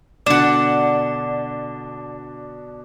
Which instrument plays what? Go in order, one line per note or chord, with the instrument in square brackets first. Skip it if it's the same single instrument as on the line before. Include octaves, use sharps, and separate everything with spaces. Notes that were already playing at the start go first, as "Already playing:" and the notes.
[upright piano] B2 D3 [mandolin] D4 F#5 [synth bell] D5 [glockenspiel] D6 E7